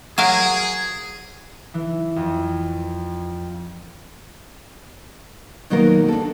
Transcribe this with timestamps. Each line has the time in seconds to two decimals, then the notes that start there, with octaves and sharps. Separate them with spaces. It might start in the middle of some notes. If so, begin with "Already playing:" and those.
0.18 F#3 G#4 A#4 F5
1.74 E3
2.16 F2
5.70 B2 D#3 F#3 A#3 A#4
6.08 D4 A4